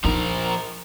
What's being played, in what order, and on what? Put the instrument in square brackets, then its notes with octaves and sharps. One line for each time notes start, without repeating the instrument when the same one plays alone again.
[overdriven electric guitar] F3 A#4 [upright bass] D#4